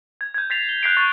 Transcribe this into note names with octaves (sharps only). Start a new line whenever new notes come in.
G#6
G6 G#6
G6 A6 B6 C7 F7
G7
F#6 G6 B6 C7 D7
C#6 G6 A6